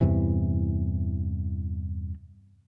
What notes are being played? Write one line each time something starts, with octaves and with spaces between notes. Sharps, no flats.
E2 G2 C3 E3